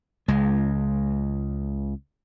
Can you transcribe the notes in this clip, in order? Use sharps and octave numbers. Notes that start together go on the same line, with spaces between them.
C#2 G#3